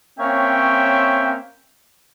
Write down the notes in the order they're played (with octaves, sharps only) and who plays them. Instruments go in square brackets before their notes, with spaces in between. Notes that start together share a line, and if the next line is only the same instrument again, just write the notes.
[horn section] A#3 C4 C#4 C#5 E5 G5